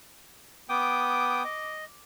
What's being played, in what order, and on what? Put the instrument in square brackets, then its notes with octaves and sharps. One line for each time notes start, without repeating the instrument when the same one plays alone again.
[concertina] B3 G5 D#6 [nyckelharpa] D6
[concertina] D#5